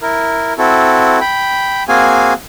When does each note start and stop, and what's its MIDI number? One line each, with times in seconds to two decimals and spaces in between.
0.01 0.53 64
0.01 0.53 70
0.58 1.19 60
0.58 1.19 64
0.58 1.19 66
0.58 1.19 69
1.21 1.83 79
1.21 1.83 83
1.88 2.33 58
1.88 2.33 60
1.88 2.33 66
1.88 2.33 68
1.88 2.33 77
1.88 2.33 80